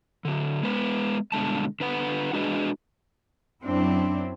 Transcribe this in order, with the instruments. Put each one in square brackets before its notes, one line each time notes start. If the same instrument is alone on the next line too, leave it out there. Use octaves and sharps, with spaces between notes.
[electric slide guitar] D3 F#3
G#3 B3 B4
G2 B2 D3 G#3 A5
D3 B4 F#5
G#3 D4 F#4 G#4 B4 D#5
[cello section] F#2 C4 D4 E4